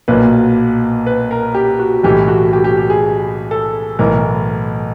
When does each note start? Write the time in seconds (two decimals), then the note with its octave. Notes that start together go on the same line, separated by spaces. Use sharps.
0.08 B1 A#2 F#3 A#3 B4
1.06 B4
1.31 A#4
1.55 G4
1.79 F#4
2.03 B1 A2 E3 G4
2.28 F#4
2.53 G4
2.64 G4
2.77 G4
2.90 G#4
3.51 A4
3.99 B1 A2 E3 A#4